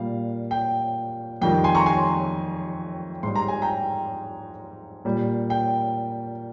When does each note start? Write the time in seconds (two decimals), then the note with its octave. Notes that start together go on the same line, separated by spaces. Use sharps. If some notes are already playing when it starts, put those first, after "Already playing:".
Already playing: A#2 G3 F5
0.51 G5
1.41 F2 D#3 G3 G5
1.64 G#5 C6
1.75 A#5 C#6
1.86 G#5 C6
3.23 G#2 G3 C6
3.36 A#5
3.48 G#5
3.62 G5 A#5
5.05 A#2 G3
5.50 G5